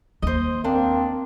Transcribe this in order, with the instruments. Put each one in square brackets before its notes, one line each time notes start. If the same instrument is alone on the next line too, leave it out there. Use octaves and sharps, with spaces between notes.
[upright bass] D#2 [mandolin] C5 D#5
[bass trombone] A#3 [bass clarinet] C4 [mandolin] D4